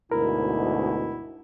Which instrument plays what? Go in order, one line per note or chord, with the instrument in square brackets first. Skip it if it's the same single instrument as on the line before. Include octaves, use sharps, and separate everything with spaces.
[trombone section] D2 G#2 B2 [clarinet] E4 [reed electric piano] A#4